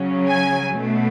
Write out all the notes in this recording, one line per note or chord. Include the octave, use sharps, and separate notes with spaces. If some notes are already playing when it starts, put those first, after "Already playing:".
Already playing: C#3 F#3 C#4
G#5
B2 A3